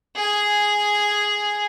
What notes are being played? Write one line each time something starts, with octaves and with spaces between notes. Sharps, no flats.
G#4 G#5